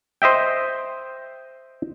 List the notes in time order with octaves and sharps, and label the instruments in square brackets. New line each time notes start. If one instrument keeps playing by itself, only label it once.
[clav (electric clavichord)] C5 D#5 E5 G5